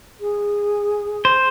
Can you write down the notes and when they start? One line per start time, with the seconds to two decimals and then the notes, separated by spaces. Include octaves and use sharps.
0.21 G#4
1.25 C5